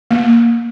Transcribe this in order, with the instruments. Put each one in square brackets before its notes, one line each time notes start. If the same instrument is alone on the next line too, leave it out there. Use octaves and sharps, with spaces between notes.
[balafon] A#3